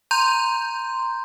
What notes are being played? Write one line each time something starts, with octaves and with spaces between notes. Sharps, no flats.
A#5 C6 G6